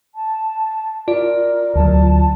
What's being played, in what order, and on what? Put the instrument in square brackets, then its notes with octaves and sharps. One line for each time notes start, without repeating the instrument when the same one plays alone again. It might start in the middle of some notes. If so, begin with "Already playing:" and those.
[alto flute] A5
[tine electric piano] F4 D5 [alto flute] A#4
[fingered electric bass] D2 F#3 [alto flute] A5